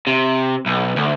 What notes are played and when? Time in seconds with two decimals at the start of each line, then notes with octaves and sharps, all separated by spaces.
0.07 C3
0.66 B1
0.96 D2